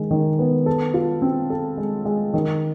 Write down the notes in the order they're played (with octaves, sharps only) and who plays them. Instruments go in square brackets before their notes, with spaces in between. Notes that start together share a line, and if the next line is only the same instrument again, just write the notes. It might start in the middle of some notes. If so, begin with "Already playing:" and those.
Already playing: [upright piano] D#3 G#3
D#3
B3
A4
F4
C4
A4
G#3
G#3
D#3